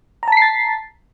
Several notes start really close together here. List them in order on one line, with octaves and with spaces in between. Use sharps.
A#5 A5 B6 C7 A6